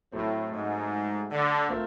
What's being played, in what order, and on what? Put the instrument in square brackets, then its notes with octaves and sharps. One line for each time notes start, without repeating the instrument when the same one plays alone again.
[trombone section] A2 [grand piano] F#3 A3 C4
[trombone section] G#2
D3
[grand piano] A3 C4 F4 A#4